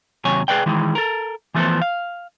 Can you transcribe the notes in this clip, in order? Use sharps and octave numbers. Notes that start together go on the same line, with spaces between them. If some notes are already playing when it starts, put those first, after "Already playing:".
D#2 C3 F#3 C#5 G#5
G#4 B4 C#5 D5 G5
D#3 E3 G#3
A4 A#4
E3 F3 A3 B3 A4 C5
F5